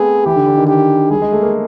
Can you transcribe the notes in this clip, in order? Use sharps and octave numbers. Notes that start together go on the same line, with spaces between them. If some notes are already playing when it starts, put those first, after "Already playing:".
Already playing: A3 B3 C4 G#4
E3 G4
D3
D3
D#3
D#3 G4
G3 G#4
G#3
A3
A#3